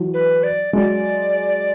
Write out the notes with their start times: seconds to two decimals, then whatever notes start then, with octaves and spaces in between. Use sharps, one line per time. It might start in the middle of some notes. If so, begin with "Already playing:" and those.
Already playing: E3 F#3
0.14 B4
0.43 D5
0.73 F#3 G#3 D5